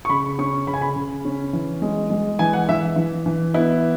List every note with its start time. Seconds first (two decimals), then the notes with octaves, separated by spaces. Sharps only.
0.05 C#6
0.09 C#3 B5
0.38 C#4 C#6
0.67 C#3 B5
0.74 G#5
0.81 B5
0.96 C#3
1.25 C#4
1.53 E3
1.82 G#3
2.10 G#3
2.39 E3 G#5
2.53 F#5
2.69 E3 E5
2.96 E3
3.26 E3
3.54 B3 E4